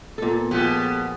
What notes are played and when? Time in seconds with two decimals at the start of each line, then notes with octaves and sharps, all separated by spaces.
0.18 A#2 B3 A4
0.51 B2 F3 G#3 G4